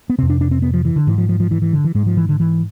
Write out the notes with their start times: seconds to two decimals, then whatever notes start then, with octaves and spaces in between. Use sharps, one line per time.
0.10 B3
0.18 F2 C3 C4
0.30 D4
0.41 D4
0.51 C4
0.62 B3
0.74 F3
0.85 E3
0.96 D3
1.07 G#2 E3
1.18 F3
1.29 F3
1.40 F3
1.51 E3
1.62 E3
1.73 D3
1.84 E3
1.95 G#2 G#3
2.06 F3
2.17 E3
2.29 D3
2.40 E3